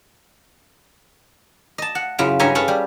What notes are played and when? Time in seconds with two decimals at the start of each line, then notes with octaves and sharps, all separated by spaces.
1.78 D#5 A5
1.95 F#5
2.18 F#2 C#3 E4 F4 F5
2.39 G2 C#4 E5 G#5 A#5
2.55 G#4 A4 B4 C#5 F5
2.68 G3